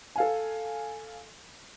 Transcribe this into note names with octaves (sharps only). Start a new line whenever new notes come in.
A4 F5 G#5